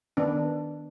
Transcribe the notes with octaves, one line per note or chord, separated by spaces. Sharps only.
D#3 B3 D4